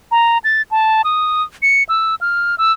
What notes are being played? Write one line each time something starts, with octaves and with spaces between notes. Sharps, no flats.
A#5
A6
A5
D#6
C#7
E6
F6
E6